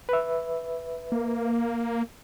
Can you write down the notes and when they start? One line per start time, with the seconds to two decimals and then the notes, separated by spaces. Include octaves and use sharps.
0.09 B4 E5
1.12 A#3